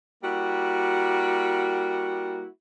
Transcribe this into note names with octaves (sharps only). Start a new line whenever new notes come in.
G3 A#3 E4 F#4